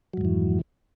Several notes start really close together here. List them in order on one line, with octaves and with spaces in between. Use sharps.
F#3 G#2 F2 E3